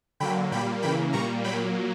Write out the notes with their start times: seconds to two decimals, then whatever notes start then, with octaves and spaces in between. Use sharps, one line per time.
0.20 D3 F#3 A#3 G5 B5
0.52 A#2 G3 A#3 G5 B5
0.82 C#3 E3 A#3 G5 B5
1.13 A#2 G3 A#3 A#5 C#6
1.44 A#2 F#3 A#3 G5 B5